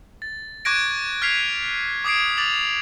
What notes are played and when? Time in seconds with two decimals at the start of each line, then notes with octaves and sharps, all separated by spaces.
0.22 A6
0.65 C#6 D6 F#6 G#6 A#6 D7
1.22 F6 G#6 B6 C7 F7
2.05 D6 D#6 G#6 C7 D7
2.37 D6 A6 F7 F#7